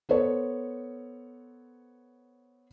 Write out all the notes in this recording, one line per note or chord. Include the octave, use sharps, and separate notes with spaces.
B3 A4 C5 C#5